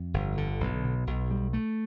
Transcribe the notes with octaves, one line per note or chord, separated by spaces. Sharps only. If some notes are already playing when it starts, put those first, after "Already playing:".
Already playing: F2
G1
D3
B1
B2
B1
G3
A3